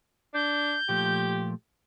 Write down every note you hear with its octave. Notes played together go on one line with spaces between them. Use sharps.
D4 G6
A#2 F3 A3 G4